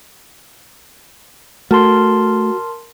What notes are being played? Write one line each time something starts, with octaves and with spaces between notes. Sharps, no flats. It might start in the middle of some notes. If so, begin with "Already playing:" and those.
A3 F#4 A#4 A5 C6